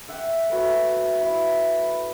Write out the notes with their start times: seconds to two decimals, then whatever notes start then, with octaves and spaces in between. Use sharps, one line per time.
0.09 E5 F#5 G5 D6
0.50 A3 B3 F#4 F#5
1.21 E4 B4 F5